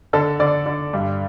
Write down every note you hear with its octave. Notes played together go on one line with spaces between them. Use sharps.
D3 A4
D3 D5
D3
G2